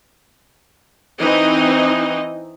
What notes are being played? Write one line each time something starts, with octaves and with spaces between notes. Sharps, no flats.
E3 C4 D#4 D#5